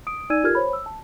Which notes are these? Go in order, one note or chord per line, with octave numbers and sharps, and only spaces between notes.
D#6 D7
D#4 D5 G#5 E6 G#6 D#7
F4 G4 A4 A#4 F6 G#6
C5 C#5 B5
E6
A5